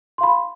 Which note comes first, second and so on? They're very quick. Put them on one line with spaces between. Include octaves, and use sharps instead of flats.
C6 F5 B5